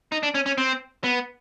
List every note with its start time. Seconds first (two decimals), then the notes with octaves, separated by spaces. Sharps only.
0.12 D#4
0.23 D4
0.34 C#4
0.46 C#4
0.58 C4
1.04 B3